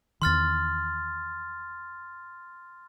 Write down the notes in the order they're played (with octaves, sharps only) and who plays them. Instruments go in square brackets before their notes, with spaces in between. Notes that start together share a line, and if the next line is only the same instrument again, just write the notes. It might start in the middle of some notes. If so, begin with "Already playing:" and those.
[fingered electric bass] E2 D#3 [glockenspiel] C6 F6 A6